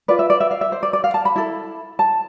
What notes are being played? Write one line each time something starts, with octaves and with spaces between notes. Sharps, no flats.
F4 B4 D5
E5
D5
E5
F5
E5
C5
D5
D5
F5
A5
B5
E4 A4
A5